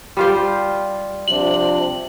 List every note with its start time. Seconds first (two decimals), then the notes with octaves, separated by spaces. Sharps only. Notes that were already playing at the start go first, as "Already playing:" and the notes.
0.17 G3 F4 C5
1.28 C3 F3 D4 F#7